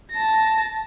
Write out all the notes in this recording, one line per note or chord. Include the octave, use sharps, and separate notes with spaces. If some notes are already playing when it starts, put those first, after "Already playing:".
A5 A#6